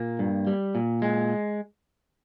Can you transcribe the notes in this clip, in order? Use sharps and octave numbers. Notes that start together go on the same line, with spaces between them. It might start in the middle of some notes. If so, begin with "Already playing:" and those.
Already playing: A#2 A#3
G2
G3
A#2
G#3